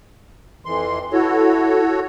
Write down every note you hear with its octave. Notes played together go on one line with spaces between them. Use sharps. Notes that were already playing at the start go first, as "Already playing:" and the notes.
F2 E3 C6
E4 F#4 A4 C#5